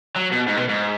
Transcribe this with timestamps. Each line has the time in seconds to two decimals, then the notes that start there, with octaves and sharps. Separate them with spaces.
0.16 F#3
0.32 B2
0.48 G#2
0.57 B2
0.69 G#2